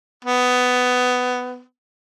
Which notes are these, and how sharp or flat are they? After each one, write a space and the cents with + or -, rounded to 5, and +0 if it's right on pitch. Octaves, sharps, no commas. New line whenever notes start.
B3 +15